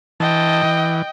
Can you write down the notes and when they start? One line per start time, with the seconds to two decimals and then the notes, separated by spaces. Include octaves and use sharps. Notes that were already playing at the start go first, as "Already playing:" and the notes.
0.20 E3 D#5 G5 A5
0.63 E3